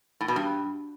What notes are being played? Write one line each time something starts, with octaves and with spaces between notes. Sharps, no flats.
A2
B2
G2